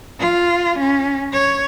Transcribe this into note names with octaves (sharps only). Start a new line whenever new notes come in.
F4
C#4
C#5